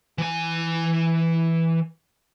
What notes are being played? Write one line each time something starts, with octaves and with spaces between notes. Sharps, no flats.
E3 G#5